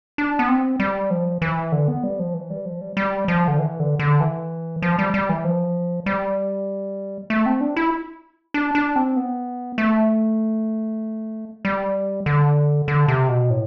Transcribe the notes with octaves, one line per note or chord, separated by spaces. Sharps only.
D4
B3
C4
G3
F3
E3
D3
B3
G3
F3
E3
G3
F3
G3
G3
F3
D3
E3
D3
D3
E3
F3
G3
G3
E3
F3
G3
A3
C4
D4
E4
D4
D4
C4
B3
A3
G3
D3
D3
C3
B2
A2